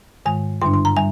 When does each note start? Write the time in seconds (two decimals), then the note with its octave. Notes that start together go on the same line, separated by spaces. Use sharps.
0.25 G#2 D#3 G#3 G#5
0.62 G2 D3 G3 D4 C6
0.74 C6
0.85 A#5
0.97 G3 G#5